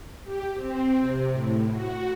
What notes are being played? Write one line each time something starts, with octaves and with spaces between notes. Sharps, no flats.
G4
C4
C3
A2
F#4